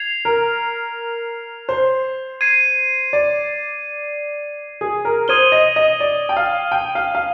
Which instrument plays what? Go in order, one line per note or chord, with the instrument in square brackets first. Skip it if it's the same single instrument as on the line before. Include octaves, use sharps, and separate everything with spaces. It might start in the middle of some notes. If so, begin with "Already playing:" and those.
Already playing: [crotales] G#6 C7 F7
[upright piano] A#4
C5
[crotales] G#6 C7 D#7
[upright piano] D5
G#4
A#4
[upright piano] C5 [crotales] D#6 G#6 D#7 G7
[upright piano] D#5
D#5
D5
G5
F5
G5
F5
F5